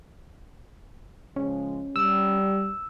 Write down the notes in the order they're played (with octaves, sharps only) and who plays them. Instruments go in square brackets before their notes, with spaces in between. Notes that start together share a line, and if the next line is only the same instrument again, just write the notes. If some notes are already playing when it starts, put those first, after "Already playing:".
[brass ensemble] C#3 F3 G#3 [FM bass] C#4
[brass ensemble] G3 [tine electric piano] E6